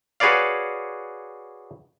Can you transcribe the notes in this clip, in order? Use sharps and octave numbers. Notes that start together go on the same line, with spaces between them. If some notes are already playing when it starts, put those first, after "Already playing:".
F#4 G#4 B4 C#5 D5 F5